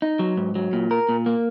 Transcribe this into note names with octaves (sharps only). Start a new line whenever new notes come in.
D#4
F#3
G#2
F#3
A#2
A#4
A#2
A#3